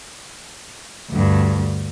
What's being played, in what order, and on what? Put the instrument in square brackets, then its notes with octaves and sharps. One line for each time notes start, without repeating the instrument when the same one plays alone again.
[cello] D2 G2